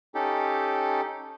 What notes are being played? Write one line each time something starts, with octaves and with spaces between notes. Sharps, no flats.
C#4 D#4 G4 A4